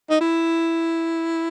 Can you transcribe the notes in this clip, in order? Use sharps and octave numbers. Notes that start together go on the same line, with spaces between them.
D#4
E4